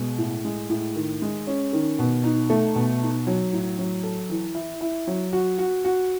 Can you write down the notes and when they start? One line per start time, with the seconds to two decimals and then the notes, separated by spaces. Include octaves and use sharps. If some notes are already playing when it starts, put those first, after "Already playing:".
Already playing: B2 G#3
0.18 A2
0.45 G#3
0.69 A2
0.95 D#3
1.22 G#3
1.47 C#4
1.73 D#3
1.99 B2
2.24 D#4
2.50 A3
2.75 B2
3.01 D#4
3.27 F#3
3.53 A2
3.79 F#3
4.03 A4
4.29 E3
4.55 E4
4.81 E4
5.07 F#3
5.33 F#4
5.58 F#4
5.84 F#4